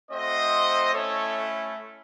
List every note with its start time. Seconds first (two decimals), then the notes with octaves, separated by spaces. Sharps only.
0.10 A3 C4 F#4 C5 D#5
0.93 A3 C#4 E4 A4 C#5